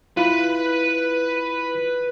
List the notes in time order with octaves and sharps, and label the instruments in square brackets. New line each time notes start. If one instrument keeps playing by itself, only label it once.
[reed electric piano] E4 F4 [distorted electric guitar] B4 B5